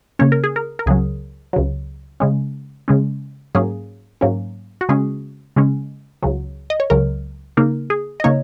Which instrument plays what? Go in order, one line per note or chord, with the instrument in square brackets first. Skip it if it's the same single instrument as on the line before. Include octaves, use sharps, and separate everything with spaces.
[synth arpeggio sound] C#3 A#3 C#4 C#5
A#4
G#4
A#4
A#4
C#2 C#3 F#3 G#4
C#2 C#3 F#3
C#3 G#3 C#4
C#3 G#3 C#4
G#2 F#3 A#3 C#4 G#4
G#2 F#3 A#3 C#4
F#4
C#3 G#3 C#4 G#4
C#3 G#3 C#4
C#2 C#3 F#3
D#5
C#5
C#2 C#3 F#3 A#4
C#3 A#3 D#4 A#4
G#4
D#5
C#3 A#3 D#4 C#5